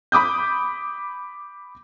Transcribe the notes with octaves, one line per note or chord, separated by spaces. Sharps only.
B5 D6 D#6 G6